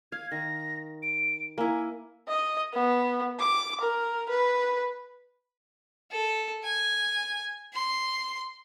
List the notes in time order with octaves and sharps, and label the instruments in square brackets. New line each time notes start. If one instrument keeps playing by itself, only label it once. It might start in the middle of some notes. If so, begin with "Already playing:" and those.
[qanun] F5 [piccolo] G#6
[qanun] D#3 [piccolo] A#6
[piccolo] D7
[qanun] A#3 E4 [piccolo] G#5
[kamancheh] D#5
B3
D6
A#4
B4
[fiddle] A4
G#5
C6